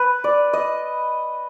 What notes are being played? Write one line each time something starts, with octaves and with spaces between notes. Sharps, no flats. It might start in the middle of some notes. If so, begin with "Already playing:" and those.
Already playing: B4
D5
D#5